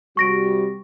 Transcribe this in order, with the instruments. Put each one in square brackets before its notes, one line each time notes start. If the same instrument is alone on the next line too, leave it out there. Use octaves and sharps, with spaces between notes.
[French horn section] C3 G3 F#4 [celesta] C#6 A#6 D7